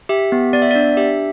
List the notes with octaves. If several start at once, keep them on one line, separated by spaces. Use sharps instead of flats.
G4 E5
B3
B3 D5
E5
D4 D5
G4 E5